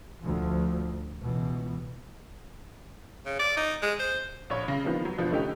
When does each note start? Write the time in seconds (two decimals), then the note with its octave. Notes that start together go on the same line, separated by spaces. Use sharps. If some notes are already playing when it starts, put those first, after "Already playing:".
0.21 D2 F3
1.18 C#2 B2 E3
3.26 C#3
3.39 D5
3.57 D#4
3.82 G#3
3.99 C5
4.50 A#1 C#5 B5
4.68 C#3 A#6
4.84 D#3 F3 A#3 B3 D4
5.05 F#3
5.18 G1 B2 F3 D4
5.32 D3 A3 C#4 D#4 G4